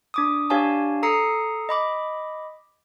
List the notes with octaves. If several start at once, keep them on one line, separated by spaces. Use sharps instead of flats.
D4 D6 D#6
D4 G4 C#5 F5 G#5 A5
A4 A#5 D#6 C7 C#7
D#5 B5 D6